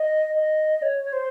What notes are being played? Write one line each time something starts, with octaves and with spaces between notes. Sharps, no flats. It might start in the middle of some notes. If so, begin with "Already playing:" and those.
Already playing: D#5
D#5
C#5
C5